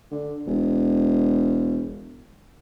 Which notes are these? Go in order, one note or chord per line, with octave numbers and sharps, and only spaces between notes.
D3
E1